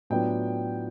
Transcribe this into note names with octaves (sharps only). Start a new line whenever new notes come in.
A2 F#3 B3 D4 F4 G5